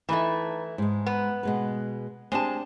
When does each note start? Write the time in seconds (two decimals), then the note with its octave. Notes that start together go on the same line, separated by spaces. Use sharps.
0.09 E3 A3 D#4 B4
0.78 G#2 G#3
1.06 B3
1.43 B2 G#3 B4
2.32 G#3 C4 D4 G4 A5